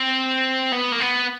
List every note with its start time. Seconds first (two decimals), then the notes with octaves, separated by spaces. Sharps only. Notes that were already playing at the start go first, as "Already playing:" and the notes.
Already playing: C4
0.72 B3
0.92 A#3
1.01 B3